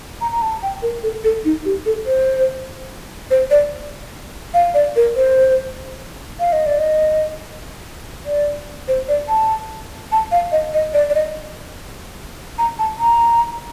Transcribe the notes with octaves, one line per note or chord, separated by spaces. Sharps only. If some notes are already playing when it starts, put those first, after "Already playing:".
A#5
A#5
A5
G5
A#4
A4
A4
D#4
G4
A4
C5
C5
D5
F5
D5
A#4
C5
F5
D#5
D5
D#5
D5
C5
D5
A5
A5
F5
D#5
D#5
D5
D5
D#5
A#5
A5
A#5